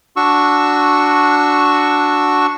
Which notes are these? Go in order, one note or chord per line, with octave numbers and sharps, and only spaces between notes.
D4 F#4 C#6 E6